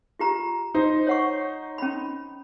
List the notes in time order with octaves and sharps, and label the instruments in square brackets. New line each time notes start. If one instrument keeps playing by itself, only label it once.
[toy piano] F4 G4 A#5
[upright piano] D#4 C5
[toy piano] C#5 F#5 C#6
C#4 B5